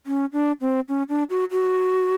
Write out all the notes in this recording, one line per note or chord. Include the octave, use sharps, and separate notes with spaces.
C#4
D4
C4
C#4
D4
F#4
F#4